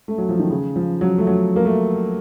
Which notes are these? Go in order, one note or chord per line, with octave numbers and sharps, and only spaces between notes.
A3
F#3
F3
D#3
C#3
F3
F#3
A3
F#3
A#3
A3